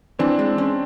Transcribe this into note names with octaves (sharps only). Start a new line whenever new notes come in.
E3 C4 D4
G#3
C#4